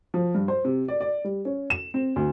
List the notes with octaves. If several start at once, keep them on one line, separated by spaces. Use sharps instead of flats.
F3
G2
C5
C3
D5
D5
G3
C#4
E7
C4
D2